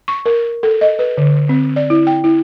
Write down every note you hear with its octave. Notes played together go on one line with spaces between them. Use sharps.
C#6
A#4
A4
D#5
B4
D3
C4
D5
E4
G5
E4